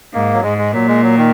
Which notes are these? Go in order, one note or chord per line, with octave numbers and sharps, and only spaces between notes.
G#2 A#3
F#3
G#2 G#3
G#3
A#2 F#3
G#3
F#3
D#3